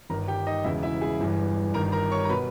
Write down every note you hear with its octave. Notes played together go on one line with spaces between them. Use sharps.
G1 G2 D#3 A#4 A#5
G4 G5
D#4 D#5
E1 E2 C#3 E3 E4 E5
E4 E5
G#4 G#5
G1 G2 E3
G1 G2 D#3 A#4 A#5
A#4 A#5
C#5 C#6
A#5
B2 B4 B5